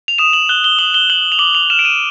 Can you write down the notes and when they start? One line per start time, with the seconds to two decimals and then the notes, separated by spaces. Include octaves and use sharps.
0.08 F7
0.18 D#6 E7
0.33 F#7
0.49 F#6 G7
0.64 G7
0.79 D#6 F#7
0.94 G7
1.10 F#6 F#7
1.32 F7
1.39 D6 F#7
1.55 F7
1.70 F6 E7
1.79 D7
1.85 D#7